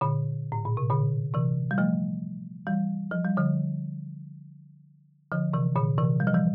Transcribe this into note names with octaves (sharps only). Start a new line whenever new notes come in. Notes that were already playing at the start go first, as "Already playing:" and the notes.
A#2 D3
A2
A#2
C3
A#2 D3
C3 E3
G3
F3 A3
E3 G3
F3
G3
D3 F3
D3 F3
C3 E3
A#2 D3
C3 E3
G3
F3
E3 G3